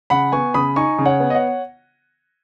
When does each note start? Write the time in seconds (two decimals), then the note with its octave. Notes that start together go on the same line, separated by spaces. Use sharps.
0.10 C#3 F#5 B5
0.32 B3 G#5 C#6
0.54 C#3 B5 D#6
0.76 D#4 G#5 C#6
0.98 C#3
1.05 C#5 F#5
1.20 B3
1.30 D#5
1.35 C#5 F#5